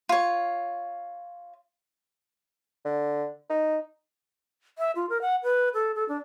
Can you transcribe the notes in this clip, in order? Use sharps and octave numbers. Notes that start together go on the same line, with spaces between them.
F4 C#5
D3
D#4
E5
F4
A#4
F#5
B4
A4
A4
D4